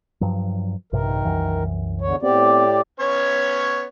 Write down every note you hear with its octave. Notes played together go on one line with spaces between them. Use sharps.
G2 F3 F#3
A#1 G2 C3 D#3 A#4
C2 F#2 E3
E2 D3 C#5
A2 B3 C4 G4 D5
B3 C#4 C#5